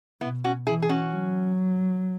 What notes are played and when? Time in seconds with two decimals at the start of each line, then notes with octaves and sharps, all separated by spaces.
0.21 B2 B3 E4
0.44 C#4 F#4
0.67 E3 E4 G#4
0.82 G#4
0.89 C#4 F#4
1.12 F#3